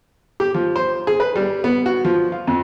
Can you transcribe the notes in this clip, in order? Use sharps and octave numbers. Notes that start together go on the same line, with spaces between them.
G4
F3
C5
G#4
B4
G3
B3
F#4
F3
F4
F2